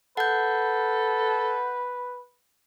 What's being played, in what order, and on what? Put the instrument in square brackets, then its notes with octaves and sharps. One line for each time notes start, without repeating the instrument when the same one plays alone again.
[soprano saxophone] A4 [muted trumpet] B4 [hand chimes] F#5 G6